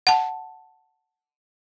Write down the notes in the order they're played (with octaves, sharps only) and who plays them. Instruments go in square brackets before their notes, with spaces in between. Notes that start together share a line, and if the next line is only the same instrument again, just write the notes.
[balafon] F#5 A5